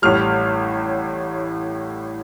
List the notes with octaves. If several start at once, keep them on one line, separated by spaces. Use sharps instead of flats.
A1 A2 G3 F6